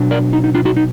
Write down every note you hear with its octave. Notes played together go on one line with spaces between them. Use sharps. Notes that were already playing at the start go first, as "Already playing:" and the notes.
Already playing: B2 F#3 D4
A#4 D5
D#4
D#4
D4 F4
D#4 F#4
D#4